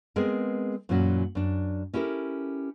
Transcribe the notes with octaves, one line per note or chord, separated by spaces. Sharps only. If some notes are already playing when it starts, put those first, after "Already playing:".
G#3 B3 C4 G#4 A#4
F#2 A#2 E3 F#3 C#4 F#4
F#2 D4
C#4 E4 G4 A4 A#4